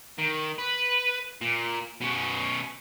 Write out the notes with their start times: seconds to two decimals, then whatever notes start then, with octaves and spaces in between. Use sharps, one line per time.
0.19 D#3
0.59 B4
1.42 A#2
2.01 B2 C#4